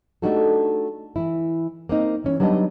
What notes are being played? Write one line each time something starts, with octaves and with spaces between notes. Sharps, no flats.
A3 D4 D#4 F#4 G4 A4
E3 E4
A#3 C4 D#4
E3 C#4
F#3 G3 B3 D4 D#4 D#5